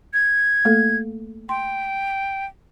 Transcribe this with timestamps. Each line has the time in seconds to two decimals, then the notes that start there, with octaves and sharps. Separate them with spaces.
0.14 G#6
0.65 A3 A#3 A4
1.49 G5 C6